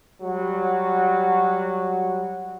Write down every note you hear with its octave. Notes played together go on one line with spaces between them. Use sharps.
F#3 G3 F#4